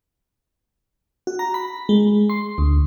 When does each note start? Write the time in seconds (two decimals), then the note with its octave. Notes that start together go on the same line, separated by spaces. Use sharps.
1.27 F#4
1.39 A#5
1.54 B5
1.89 G#3
2.30 C6
2.58 D2